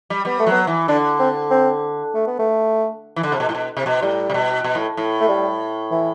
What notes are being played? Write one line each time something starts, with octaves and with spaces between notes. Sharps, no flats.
G3
G3 B3
A3
F#3
B3
E3
D3 D4
C4
C4
A3
B3
A3
E3
D3
C3
B2
A2
B2
C3
B2
A2 G3
C3
B2
B2
A2
A2
A3
G3
E3